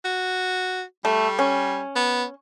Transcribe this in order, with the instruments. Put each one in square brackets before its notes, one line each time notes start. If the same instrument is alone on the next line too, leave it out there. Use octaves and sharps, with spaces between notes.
[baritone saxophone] F#4
[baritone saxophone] G3 [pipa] A3
[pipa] C#4
[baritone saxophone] B3